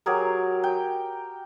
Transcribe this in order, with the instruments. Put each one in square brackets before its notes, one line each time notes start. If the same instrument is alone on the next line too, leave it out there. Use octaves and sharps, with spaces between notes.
[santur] F#3 G4 G#4 A#4
G5